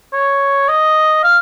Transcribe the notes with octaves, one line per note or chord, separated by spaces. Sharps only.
C#5
D#5
F5